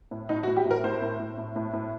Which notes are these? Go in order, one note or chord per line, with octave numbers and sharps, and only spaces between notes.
A2
A2 D#4
F#4
A2
G4
A2
A#4
A2 C5
A2
A2
A2
A2
A2